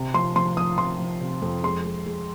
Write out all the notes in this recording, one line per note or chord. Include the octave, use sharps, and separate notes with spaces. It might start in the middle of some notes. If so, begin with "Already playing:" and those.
Already playing: C3
F3 C6
F3 C6
F3 D#6
F3 C6
F3
C3
F2
G#3 C6
G#3
G#3